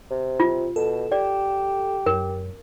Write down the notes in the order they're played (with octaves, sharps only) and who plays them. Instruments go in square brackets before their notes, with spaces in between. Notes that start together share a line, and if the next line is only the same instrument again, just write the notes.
[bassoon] C3
[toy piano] F4
[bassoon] B2 [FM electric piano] A4
[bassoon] G4 [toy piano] D5
[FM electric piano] F#2 [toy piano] A#4